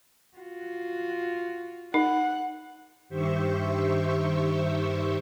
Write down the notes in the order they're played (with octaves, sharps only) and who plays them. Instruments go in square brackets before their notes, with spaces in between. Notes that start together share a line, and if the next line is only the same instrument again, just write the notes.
[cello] F4 F#4
[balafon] D#4 [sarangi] F#5
[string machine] G2 D#3 G4 C5 E5 C#6